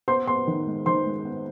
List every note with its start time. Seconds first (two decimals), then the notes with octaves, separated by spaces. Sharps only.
0.08 B3 C5 C6
0.27 B3 C5 C6
0.47 D#3
0.66 G#3
0.86 D#3 C5 C6
1.06 G#3
1.25 B3